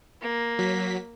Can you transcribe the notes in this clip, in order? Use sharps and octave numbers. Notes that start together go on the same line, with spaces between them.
A#3
F#3 B6